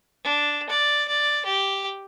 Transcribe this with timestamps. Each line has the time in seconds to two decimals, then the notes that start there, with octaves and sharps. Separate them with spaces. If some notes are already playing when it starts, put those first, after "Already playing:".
0.24 D4
0.69 D5
1.08 D5
1.45 G4